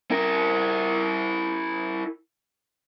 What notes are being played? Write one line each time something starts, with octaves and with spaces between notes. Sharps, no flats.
E4 A#4